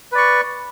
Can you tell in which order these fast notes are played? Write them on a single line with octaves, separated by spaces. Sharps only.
B4 D5 C#6